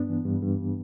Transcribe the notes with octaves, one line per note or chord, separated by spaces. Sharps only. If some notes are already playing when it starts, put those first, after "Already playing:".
Already playing: G2 B3 D4
E3
G2
G2